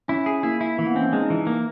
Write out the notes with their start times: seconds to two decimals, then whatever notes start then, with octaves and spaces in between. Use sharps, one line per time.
0.08 C#4 E4
0.26 G#4
0.43 A#3 E4
0.61 E4
0.78 E3 A#3
0.87 B3
0.95 C4 C#4
1.04 D4
1.13 G#3 D#4
1.30 E3
1.47 A#3